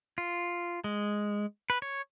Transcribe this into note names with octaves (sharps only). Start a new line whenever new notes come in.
F4
G#3
B4
C#5